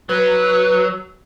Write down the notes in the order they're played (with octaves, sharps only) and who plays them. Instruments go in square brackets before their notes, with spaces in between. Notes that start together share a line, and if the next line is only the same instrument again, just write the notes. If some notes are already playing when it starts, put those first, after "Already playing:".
[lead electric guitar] F#3 [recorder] B4